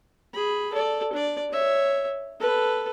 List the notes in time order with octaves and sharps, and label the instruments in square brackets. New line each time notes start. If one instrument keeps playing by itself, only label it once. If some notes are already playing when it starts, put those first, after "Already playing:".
[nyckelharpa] G#4 B5
A4 D5
D4 D5
C#5 E5
A4 B4